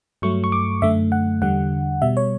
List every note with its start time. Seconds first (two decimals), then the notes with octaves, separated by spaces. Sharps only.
0.22 G2 F#3 A3 C#6
0.44 C#6
0.52 D6
0.82 F#2 D3 A3 E5
1.12 F#5
1.42 E2 D3 G3 F#5
2.02 B2 G3 E5
2.17 C#5